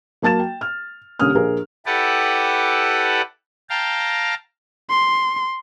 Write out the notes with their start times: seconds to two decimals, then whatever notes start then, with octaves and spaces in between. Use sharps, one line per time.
0.22 F#3 A#3 A5 A6 E7
0.39 G5
0.61 F6
1.19 C2 D3 A#3 C#4 D#6 F6
1.34 A#1 G#4 A#4
1.86 E4 G4 A4 B4 D5 F#5
3.70 F5 G5 A5 A#5
4.90 C6